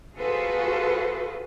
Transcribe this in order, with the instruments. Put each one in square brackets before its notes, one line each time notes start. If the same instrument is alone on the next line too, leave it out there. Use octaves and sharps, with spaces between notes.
[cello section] F4 F#4 G#4 A4 B4 C5